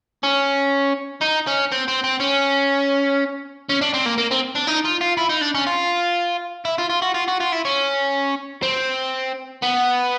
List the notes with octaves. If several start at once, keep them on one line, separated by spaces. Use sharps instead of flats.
C#4
D#4
C#4
C4
C4
C4
C#4
C#4
D4
C4
A#3
A#3
C4
D4
D#4
F4
F4
E4
D#4
D4
C#4
F4
E4
F4
F4
F#4
F4
F#4
F4
E4
C#4
C4
B3